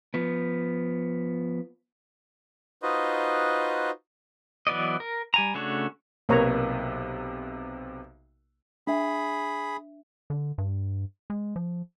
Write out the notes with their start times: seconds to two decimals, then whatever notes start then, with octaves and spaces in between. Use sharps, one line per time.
0.14 F3 B3
2.83 D#4 F4 F#4 B4 C5 D#5
4.67 E3 F#3 B3 D5 D#5
5.00 A#4
5.34 G3 G#5 A#5
5.54 C#3 A3 D4 F#4 C#5
6.29 B1 C3 A#3 B4 C#5 A#5
8.87 D4 G#4 E5 B5
10.30 D3
10.58 G2
11.30 G#3
11.56 F3